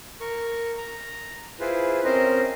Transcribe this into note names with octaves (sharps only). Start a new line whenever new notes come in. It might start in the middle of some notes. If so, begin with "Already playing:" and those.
A#4 C#6
A#5
E4 F4 G#4 B4 C5
C4 C#4 A#4 C5 D#5